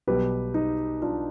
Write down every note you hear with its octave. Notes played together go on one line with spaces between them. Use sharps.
B1 B2 G3 G4 B4
D#4
D4 F4